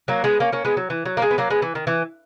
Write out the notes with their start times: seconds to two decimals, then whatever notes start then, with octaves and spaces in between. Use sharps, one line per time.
0.08 F#3 A#3
0.24 G#3 B3
0.40 A#3 C#4
0.52 A#3 C#4
0.65 G#3 B3
0.77 F#3
0.90 E3
1.05 F#3
1.17 A#3
1.22 G#3
1.31 B3
1.38 F#3 A#3
1.50 G#3 B3
1.62 E3
1.75 D#3
1.87 E3